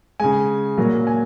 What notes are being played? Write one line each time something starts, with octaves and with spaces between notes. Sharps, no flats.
C#3 G#3 G#5
A#2 F#3 A#3
G#5